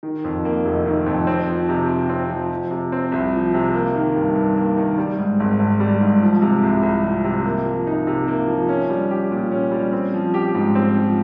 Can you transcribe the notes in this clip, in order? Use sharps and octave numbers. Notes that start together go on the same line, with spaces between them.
D#3
F2
A#3
F1
D#3
F2
C4
F3
C3
C3
C4
F3
F3
C3
C4
C2
F3
C3
A#3
D#3
G2
G2
A#3
D#3
G3
G#2
G#1
G#1
G3
G#2
F3
C3
C2
C2
F3
C3
A#3
F3
D#4
C3
A#3
F3
C#4
G3
G4
A#2
C#4
G3
C4
F3
G4
G#2
C4
F3